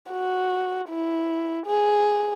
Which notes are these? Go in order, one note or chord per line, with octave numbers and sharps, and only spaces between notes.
F#4
E4
G#4